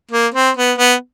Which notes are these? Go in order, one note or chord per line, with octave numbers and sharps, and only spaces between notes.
A#3
C4
B3
B3